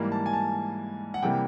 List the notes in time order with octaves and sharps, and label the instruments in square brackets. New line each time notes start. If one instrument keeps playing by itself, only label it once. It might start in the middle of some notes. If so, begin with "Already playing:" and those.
Already playing: [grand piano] G#2 E3 G3 A#3
A5
G#5
A5
F#5
C3 E3 G3 A#3 G5